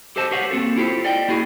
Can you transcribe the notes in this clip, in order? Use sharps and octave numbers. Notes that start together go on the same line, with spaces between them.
G4 A4 C5 D#5 A5
G4 B4 C#5 F5 F#5
A#3 C4 F#4 A4
E4 F4 G4 A4 C5
D5 D#5 G5
A#3 E4 F#4 G#4